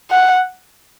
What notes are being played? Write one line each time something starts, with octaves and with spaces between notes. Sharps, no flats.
F#5